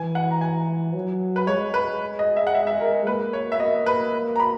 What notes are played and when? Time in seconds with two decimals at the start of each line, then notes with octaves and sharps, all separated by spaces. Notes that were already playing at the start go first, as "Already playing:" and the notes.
Already playing: E3 G#5
0.15 F#5
0.31 A#5
0.41 G#5
0.94 F#3
1.36 B4
1.47 G#3 C#5
1.74 B4
2.19 D#5
2.36 E5
2.47 F#5
2.55 E5
2.67 E5
2.80 A#4
3.06 A#3 B4
3.33 C#5
3.52 E5
3.60 A#3 D#5
3.86 B4
4.36 A#5
4.40 B5